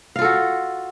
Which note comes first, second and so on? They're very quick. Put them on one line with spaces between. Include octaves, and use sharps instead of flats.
F5 F4 A4 F#4